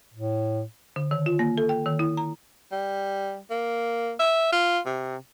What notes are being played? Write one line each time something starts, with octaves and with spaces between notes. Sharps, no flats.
A2
D3
D#3
F4
A#3
A4
G5
D#3
E4
A#5
G3
A#3
E5
F4
C3